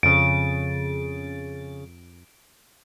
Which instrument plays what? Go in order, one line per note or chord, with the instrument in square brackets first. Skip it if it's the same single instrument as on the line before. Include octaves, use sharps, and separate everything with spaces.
[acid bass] F2 [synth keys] C#3 A6 [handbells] D7